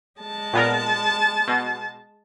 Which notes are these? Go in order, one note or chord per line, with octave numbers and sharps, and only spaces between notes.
G#3 A5
A#2 B3 A#4
B2